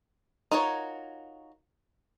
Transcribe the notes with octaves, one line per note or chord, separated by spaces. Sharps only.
D#4 F4 F#4 A#4 C#5